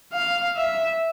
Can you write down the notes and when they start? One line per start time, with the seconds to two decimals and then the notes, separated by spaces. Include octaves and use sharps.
0.13 F5
0.56 E5